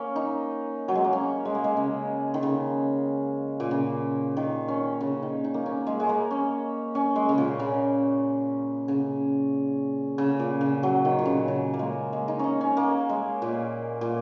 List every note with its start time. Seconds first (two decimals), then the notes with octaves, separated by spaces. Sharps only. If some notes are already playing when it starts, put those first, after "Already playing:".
Already playing: A#3 C#4
0.16 D#4
0.88 F#3
0.95 G#3
1.04 A#3
1.13 C#4
1.45 G#3
1.55 A#3
1.64 G#3
1.77 C#3
2.34 D#3
2.43 C#3
3.60 A#2
3.71 C#3
4.37 D#3
4.68 C#4
5.01 C#3
5.23 D#3
5.44 D#4
5.54 A#3
5.66 C#4
5.87 G#3
6.00 G#3
6.09 A#3
6.31 C#4
6.95 C#4
7.16 G#3
7.29 C#3
7.38 A#2
7.59 C#3
8.88 C#3
10.18 C#3
10.39 A#2
10.61 C#3
10.83 F#3
11.05 D#3
11.19 A#2
11.25 C#3
11.48 C#3
11.74 A#3
11.79 G#3
12.13 G#3
12.28 D#4
12.39 C#4 D#4
12.61 C#4
12.77 A#3
13.09 G#3
13.42 A#2
14.01 A#2